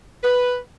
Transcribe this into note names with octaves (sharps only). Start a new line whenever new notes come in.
B4